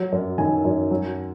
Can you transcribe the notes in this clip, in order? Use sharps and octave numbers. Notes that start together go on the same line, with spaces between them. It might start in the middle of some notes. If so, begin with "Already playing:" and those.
Already playing: F#3
F#2
D#3 G#5
F#2
F#3